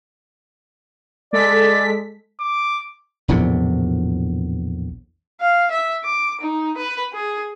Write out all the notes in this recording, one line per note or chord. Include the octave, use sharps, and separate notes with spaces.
G#3 A4 D5 B6
D6
A#1 E2 A2 C3
F5
E5
D6
D#4
B4
G#4